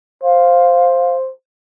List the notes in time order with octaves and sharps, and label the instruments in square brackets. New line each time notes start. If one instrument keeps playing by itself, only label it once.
[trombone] C5 [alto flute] F5